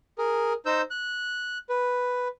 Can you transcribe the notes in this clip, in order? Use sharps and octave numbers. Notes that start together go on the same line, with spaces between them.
G#4 A#4
D#4 C5 E6 G6
F#6
B4